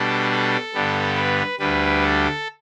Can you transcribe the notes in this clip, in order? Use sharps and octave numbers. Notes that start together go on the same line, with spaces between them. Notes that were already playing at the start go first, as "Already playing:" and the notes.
Already playing: B2 G3 D4 A4
A4
G2 D3 G3 B3
B4
D2 D3 G3 B4
A4